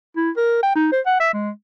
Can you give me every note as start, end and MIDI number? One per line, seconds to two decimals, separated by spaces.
0.16 0.30 64
0.37 0.58 70
0.63 0.71 79
0.75 0.91 63
0.92 1.01 72
1.06 1.16 78
1.20 1.31 76
1.33 1.50 56